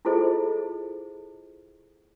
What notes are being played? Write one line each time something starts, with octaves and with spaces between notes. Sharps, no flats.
E4 F4 G#4 A4 C5 D#5